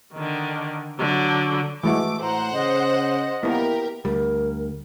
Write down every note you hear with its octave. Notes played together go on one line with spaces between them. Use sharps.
D3 D#3
D3 F#3
E3 G#3 A3 F#4 D6
A2 C5 F#5 A#5
C#3 D#5
A#3 B3 E4 G4 A#4
D2 G3 A#4